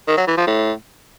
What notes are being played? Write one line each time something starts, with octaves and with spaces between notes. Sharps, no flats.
D#3
F#3
E3
F3
A2